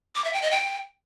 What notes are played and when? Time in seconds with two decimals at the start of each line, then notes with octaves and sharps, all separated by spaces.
0.16 D6
0.24 E5
0.33 G5
0.42 D#5
0.51 G5